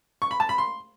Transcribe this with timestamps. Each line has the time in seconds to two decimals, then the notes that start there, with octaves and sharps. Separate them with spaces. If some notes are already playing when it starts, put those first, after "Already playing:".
0.22 C#6
0.31 B5
0.40 A5
0.49 B5
0.58 C6